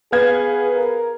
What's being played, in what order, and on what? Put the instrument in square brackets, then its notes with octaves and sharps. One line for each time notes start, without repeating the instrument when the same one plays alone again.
[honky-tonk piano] B3 F5 G#6 [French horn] G#4
[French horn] A#4